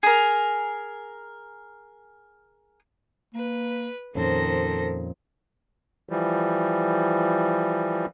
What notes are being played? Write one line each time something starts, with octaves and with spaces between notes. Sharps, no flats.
G#4 A#4
A#3 B4
F2 A#2 D#3 C#4 A4 C5 A#6
E3 F3 G3